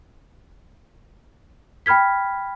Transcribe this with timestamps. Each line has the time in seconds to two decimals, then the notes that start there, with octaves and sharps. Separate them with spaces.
1.86 G5 B5 F6 G#6 B6